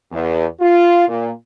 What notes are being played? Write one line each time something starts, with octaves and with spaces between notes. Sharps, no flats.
E2
F4
A#2